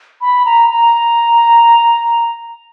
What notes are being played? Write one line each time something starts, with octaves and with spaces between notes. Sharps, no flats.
B5
A#5
A#5